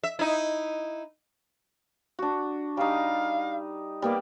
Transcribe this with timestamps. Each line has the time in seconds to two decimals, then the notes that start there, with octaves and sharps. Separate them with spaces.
0.04 E5
0.19 D#4 E4
2.19 D4 F#4
2.77 G3 D#4 F5
4.02 G3 A#3 B3 D5